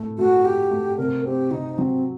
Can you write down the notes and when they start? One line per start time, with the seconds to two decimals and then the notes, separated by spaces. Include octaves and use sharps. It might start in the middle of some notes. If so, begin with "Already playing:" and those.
Already playing: A2 A3
0.18 A3 F#4
0.44 F#4 G4
0.71 A3
0.98 C3 A#4
1.25 C4 G4
1.51 C3 D#4
1.78 F#3 C4